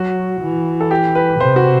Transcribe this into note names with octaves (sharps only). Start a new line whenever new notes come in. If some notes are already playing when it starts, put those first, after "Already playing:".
Already playing: F#3 F#4
E3
A4
G4
B4
C3 C5
F#4